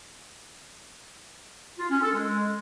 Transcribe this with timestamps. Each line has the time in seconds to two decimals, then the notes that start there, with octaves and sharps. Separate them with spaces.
1.79 F4
1.90 C#4
2.02 A4
2.14 G#3